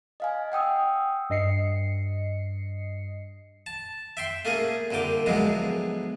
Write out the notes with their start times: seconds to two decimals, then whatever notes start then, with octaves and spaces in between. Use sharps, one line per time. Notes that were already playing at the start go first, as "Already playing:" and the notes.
0.20 D#5 F5 G#5
0.52 F#5 G5 D#6 E6
1.30 G2 D#5 C7 C#7
3.66 A5
4.17 E5 G5 C6
4.45 A3 A#3 C#4 G#4
4.91 C2 A#2 D3 G5 D6
5.26 D2 G#2 B2 F3 F#3 G#3